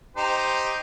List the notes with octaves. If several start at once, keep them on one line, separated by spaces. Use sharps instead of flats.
D#4 G4 C5